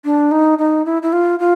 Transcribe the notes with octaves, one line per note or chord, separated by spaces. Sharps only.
D4
D#4
D#4
E4
E4
F4
F4